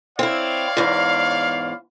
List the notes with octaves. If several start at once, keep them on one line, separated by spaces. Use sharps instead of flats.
C4 E4 C#5 D5 F5
E2 G#2